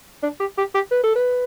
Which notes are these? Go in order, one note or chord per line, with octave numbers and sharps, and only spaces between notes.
D4
G4
G4
G4
B4
A4
B4